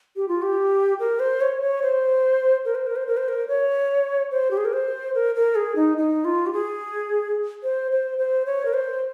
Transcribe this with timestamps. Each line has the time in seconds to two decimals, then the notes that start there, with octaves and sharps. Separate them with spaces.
0.16 G4
0.28 F4
0.42 G4
1.00 A#4
1.20 C5
1.41 C#5
1.61 C#5
1.82 C5
2.65 A#4
2.75 C5
2.86 A#4
2.96 C5
3.07 A#4
3.17 C5
3.28 A#4
3.48 C#5
4.31 C5
4.51 G4
4.57 G#4
4.65 A#4
4.73 C5
5.15 A#4
5.35 A#4
5.55 G#4
5.76 D#4
5.98 D#4
6.25 F4
6.46 G4
6.53 G#4
7.63 C5
7.92 C5
8.18 C5
8.46 C#5
8.66 A#4
8.74 C5